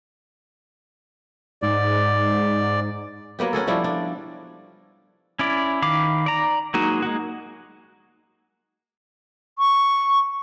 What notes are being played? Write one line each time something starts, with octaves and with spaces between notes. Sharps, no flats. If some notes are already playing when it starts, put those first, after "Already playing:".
G#2 D5
F#3 A#3 B3 G4
C#4 F#4 G#4 A4
F3 G3 D4 E4
D4
C#4 E4 D5
D#3 F5 B5 D6
D5 A#5
F#3 G#3 A#3 D#4 F#4
G#3 A#3 F#4
C#6